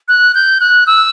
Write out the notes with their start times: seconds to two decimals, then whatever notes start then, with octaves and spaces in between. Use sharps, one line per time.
0.08 F#6
0.35 G6
0.60 F#6
0.87 E6